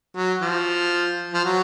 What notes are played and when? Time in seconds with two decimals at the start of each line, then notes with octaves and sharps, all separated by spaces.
0.16 F#3
0.42 F3
1.34 F3
1.45 F#3